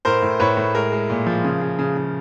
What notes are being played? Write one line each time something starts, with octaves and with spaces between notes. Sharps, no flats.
A2 A#4 C5
A2
A2 B4 C#5
A2
G#3 A#4
G#3
A#2
F3
C#3
C#3
C#3
C#3